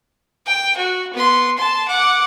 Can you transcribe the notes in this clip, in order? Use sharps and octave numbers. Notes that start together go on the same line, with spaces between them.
G5
F#4
B3 C6
A5 C6
F#5 D6